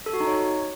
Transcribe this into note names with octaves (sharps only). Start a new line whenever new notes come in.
A4
F#4
D#4
C#5